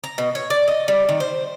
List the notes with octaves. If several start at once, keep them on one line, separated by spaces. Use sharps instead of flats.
A#5
B2
C#5
D5
D#5
G3
D#3
C5